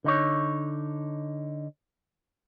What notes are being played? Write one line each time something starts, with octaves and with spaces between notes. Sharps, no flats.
D3 D#4 C#5